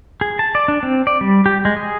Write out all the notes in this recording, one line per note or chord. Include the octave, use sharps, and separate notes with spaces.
G#4
A5
D5
D4
C4
D5
G3
G4
G#3
G#4